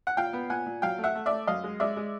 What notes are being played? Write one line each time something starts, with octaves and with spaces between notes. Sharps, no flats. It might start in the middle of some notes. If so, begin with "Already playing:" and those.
F#5
A#2 F5 G5
B3
A#2 F#5 G#5
A#2
F#3 F5 G5
A3
E5 F#5
A3
A3 D5 E5
F#2 D#5 F5
G#3
G#3 D5 E5
G#3